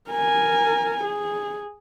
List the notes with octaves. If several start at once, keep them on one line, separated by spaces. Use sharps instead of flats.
A#4 G#5
G#4